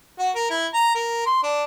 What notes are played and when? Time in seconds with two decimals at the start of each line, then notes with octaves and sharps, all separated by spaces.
0.19 F#4
0.35 A#4
0.51 E4
0.74 A#5
0.95 A#4
1.26 C6
1.43 D4